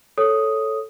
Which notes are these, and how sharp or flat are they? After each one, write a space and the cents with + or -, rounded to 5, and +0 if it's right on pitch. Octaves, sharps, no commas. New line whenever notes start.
A4 +0 C#5 +0 D#6 +0